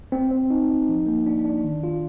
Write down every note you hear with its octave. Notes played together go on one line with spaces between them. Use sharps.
C4
C4
D#4
D#4
F3
A#3
D4
D4
D#3
F4